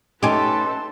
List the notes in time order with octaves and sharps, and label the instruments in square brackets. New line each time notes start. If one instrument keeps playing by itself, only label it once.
[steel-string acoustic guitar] A3 D#4 [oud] C#4 G4 [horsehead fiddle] A4 B4 [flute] C6